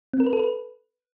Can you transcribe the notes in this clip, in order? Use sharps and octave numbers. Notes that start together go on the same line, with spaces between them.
C4
A#4
B4
A4
B4